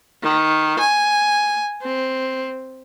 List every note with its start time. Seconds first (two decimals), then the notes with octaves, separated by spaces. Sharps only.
0.23 D#3
0.79 G#5
1.82 C4